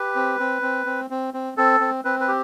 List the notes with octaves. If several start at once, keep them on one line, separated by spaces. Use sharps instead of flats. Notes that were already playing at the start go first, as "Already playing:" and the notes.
Already playing: G4 B4
C4
C4
C4
C4
C4
C4
C4 A4
C4
C4 B4
B4
G4